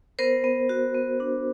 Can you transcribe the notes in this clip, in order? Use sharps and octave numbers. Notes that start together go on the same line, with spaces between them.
B3 A#4 C5
B3
F#4
B3
D4